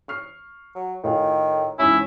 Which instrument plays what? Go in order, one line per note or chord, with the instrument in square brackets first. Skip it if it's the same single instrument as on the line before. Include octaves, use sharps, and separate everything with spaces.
[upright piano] C#6 F6 C7
[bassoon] F#3
[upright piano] A2 F4 G#4 [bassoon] D#3
[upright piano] C#2 G#2 E3 [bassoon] C#4 [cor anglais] E4